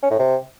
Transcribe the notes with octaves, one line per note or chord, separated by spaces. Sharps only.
C#4
A2
C3